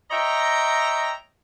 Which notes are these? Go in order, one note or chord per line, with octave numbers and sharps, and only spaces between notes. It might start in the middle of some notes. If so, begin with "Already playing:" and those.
C#5 D#5 E5 G5 A#5